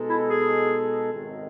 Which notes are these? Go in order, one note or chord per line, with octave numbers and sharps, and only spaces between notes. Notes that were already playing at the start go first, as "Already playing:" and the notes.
Already playing: B2 G#3 D#4 A4
E4
G#4
G#1 F#2 D#3